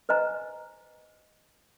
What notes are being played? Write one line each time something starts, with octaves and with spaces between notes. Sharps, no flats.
B4 C5 D#5 G#5 A#5